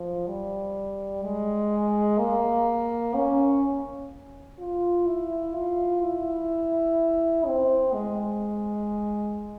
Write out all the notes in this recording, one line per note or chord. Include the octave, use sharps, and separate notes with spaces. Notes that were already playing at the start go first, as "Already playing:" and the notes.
Already playing: F3
G3
G#3
A#3
C#4
F4
E4
F4
E4
C4
G#3